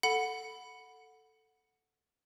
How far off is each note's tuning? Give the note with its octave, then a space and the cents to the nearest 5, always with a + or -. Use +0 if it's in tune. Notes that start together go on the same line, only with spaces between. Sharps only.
A4 +0 F#5 -10 B5 +0